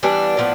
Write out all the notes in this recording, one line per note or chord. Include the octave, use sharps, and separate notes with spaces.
E3 G3 B3 D4
A2 F3 B3